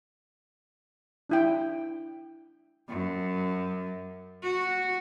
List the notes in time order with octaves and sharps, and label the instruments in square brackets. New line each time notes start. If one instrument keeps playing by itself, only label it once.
[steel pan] D4 E4 G5
[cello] F#2
F#4